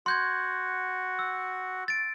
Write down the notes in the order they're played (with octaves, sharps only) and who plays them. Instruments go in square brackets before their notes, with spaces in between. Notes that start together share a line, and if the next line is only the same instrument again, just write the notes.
[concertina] F#4 F#5 [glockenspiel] C6 G6 G#6
[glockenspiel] E6
A6 D7